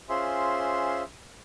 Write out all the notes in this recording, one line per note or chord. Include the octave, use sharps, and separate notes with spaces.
C#4 F4 G#4 C5 E5 C6